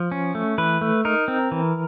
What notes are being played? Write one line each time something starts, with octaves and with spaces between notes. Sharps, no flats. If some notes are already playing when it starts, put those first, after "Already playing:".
Already playing: F3
C#4
A3
E3 B4
A3
D#4 A#4
C4
E3